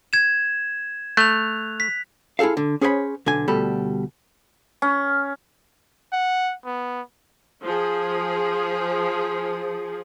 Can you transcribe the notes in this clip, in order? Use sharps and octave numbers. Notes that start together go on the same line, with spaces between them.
G#6 E7
A3 F#6 F7
B6
E4 F4 G#4 A4 F5
D3
C#4 G#4 C5 C#5 G5 B5
B1 D3 G#5
D2 B2 G3 A4 B5
C#4
F#5
B3
F3 G#4